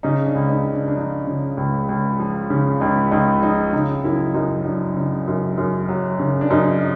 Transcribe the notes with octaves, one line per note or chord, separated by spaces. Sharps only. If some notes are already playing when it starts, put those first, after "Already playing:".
C#3 D#4
D4
C#2
D#4
C#2
D4
D4
F3 D#4
C#3
C#2
C#2
F3
C#3
C#2 D#4
C#2 D#4
F3 D#4
C#3 D#4
F#2 E4
F#2 D#4
F#3 D4
C#3
F#2
F#2
F#3
C#3
D4
F#2 D#4